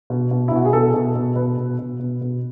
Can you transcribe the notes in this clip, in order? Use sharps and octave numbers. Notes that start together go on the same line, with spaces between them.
B2
B2
E4
B2 F#4
G#4
B2 A4
B2
B2
B2 B4
B2
B2
B2
B2